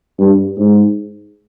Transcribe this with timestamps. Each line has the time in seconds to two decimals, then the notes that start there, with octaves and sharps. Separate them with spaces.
0.19 G2
0.57 G#2